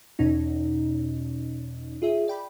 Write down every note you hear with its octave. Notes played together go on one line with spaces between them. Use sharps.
E2 B2 C#4 D#4
F4 G#4 E5
D5 G5 B5